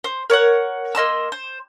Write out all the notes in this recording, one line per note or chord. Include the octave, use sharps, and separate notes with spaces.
C5
A#4 C#5 F5 F#5
A#3 D#5 C6 E6
C5